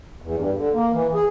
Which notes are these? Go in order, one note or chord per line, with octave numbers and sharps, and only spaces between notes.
E2
G2
D3
A#3
E3
G#4